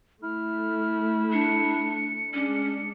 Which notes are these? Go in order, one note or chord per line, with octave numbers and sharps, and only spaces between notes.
A3 E4 F6
D4 C#7
G#3 C#4 D4